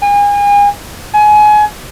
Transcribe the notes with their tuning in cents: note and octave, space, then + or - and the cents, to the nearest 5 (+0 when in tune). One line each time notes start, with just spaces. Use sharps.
G#5 -35
G#5 +25